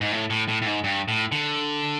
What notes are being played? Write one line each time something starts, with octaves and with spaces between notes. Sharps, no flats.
G#2
A2
A2
A2
A2
G#2
G2
A2
D3